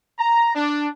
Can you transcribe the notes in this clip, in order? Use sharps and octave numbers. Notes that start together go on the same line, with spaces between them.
A#5
D4